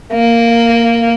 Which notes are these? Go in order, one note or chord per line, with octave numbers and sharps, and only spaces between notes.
A#3